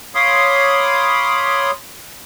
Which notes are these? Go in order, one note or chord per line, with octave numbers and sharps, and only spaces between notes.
C#5 F5 B5 C6 D6 D#6